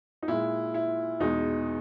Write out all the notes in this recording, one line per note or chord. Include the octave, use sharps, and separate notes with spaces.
D#4
A#2 G#3 E4
E4
E2 B2 G#3 D#4